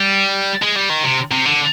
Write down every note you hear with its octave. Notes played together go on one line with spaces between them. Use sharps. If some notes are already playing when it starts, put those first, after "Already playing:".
Already playing: G3
G#3
G3
D#3
C3
C3
D3